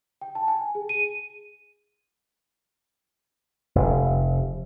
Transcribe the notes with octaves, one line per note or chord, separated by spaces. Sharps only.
G5
A5
G#5
G#4
D#7
F1